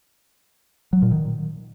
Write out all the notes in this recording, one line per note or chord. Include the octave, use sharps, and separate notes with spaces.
F#3
A#2
D#3